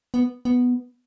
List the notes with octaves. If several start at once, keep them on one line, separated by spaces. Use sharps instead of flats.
B3
B3